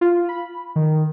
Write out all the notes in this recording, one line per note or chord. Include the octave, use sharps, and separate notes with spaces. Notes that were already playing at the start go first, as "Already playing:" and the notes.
F4
B5
D#3